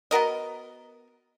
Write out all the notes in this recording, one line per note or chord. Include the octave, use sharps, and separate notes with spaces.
B3 F#4 A#4 D#5